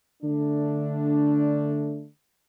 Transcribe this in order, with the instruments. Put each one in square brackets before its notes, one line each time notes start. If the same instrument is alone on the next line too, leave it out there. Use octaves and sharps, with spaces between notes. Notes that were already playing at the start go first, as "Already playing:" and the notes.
[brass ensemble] D3 A3 D4